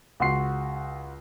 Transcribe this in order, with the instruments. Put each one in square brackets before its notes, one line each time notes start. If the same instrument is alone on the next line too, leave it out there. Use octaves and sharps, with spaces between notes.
[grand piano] C#2 F#4 C6 C7